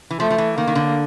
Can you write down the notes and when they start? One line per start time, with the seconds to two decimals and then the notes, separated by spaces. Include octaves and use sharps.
0.10 E3
0.20 F3 A3
0.30 F3
0.38 E3
0.57 D#3 A#3
0.67 D#3
0.75 D3